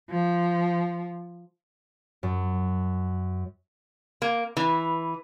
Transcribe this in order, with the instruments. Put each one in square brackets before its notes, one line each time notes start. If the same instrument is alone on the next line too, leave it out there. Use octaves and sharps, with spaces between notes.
[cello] F3
[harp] F#2
[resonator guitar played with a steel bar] A#3
E3